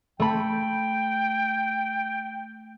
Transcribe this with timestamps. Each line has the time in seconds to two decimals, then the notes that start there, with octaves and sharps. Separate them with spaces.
0.20 A3 G5 B5